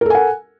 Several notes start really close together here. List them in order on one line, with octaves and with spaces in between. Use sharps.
A#4 A4 G#5 F#5